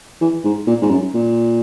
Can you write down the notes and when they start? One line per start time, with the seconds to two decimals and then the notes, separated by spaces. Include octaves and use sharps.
0.21 E3
0.45 G#2
0.67 A#2
0.82 G#2
0.91 F#2
1.14 A#2